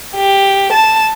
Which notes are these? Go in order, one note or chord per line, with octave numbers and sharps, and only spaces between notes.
G4
A5 E7